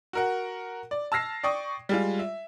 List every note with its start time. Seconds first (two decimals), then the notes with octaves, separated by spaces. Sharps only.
0.13 F#4 A#4 F#5
0.91 D5
1.12 A5 E6 F6 A#6 C7
1.43 D5 G5 C#6 D#6
1.89 G3 G#3 F4
2.19 E5